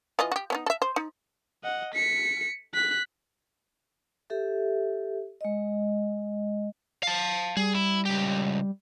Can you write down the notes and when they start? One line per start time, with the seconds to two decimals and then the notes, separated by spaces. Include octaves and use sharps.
0.19 E3 F4 D#5
0.32 F#4 G4
0.50 B3 C#4 D#4
0.66 A4 E5
0.82 C5
0.96 D#4
1.64 D#5 F#5
1.95 B6 C#7
2.74 F#6 B6
4.30 G4 A4 E5
5.41 G#3 D#5
7.03 F5 A5
7.57 G3 G#4
7.75 E4
8.05 C#2 G4